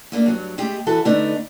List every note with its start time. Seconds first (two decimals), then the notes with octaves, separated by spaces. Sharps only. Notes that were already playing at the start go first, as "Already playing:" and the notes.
0.12 A3 A#3 D4
0.26 G2 F#3
0.58 G#3 A3 G4
0.86 E3 F#4 A4 E5
1.05 D3 A3 B3 D4 D#4